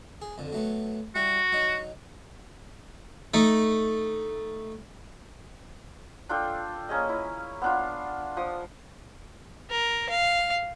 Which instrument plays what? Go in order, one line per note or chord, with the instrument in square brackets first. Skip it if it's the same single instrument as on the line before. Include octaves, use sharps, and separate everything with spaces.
[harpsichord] G#4
F2 D3
F#3 A3 B3
[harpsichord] G3 E4 [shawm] F#4
[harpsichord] F#3 D#4
A3 D#4
[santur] D4 F4 A4 G5
A#3 C#4 G#4 D#5
E4
B3 D4 F4
F3 D#6
[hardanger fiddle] A#4
F5